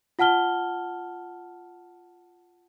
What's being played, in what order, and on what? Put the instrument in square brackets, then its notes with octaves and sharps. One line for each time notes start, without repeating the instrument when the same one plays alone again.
[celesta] F4 F#5 A5 F6 G7